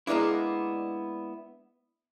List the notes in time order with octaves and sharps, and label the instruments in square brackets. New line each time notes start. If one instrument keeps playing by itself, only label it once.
[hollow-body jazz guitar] G#3 A#3 B3 D4 E4